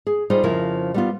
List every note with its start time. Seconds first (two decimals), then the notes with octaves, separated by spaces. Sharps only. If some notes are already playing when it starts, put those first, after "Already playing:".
0.07 G#4
0.30 G3 D#4 F4 G#4 C5
0.43 F2 C#3 F3 E4 A#4
0.94 G3 B3 F4